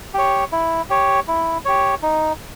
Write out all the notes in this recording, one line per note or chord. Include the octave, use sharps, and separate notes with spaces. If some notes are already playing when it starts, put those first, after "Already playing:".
G4 C#5
E4
G4 C#5
E4
G4 C#5
D#4